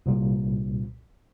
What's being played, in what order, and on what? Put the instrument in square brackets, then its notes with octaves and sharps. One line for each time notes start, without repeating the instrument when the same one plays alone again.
[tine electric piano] C2 A#2